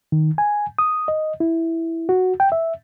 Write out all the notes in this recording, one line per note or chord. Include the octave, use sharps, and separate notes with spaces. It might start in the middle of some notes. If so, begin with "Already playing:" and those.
D#3
G#5
D#6
D#5
E4
F#4
G5
E5